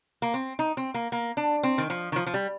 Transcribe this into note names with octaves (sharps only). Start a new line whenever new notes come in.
A#3
C4
D#4
C4
A#3
A#3
D4
C4
D#3
F3
D#3
F3
F3
G3